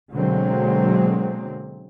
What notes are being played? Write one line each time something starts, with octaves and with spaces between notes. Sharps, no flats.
B2 D3 F#3 G#3 A#3 C4